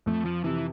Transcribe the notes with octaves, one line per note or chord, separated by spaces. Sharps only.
F2 A3
F3
C3 E3